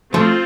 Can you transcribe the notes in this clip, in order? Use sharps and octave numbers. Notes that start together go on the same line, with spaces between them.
F3 A3 C4 F4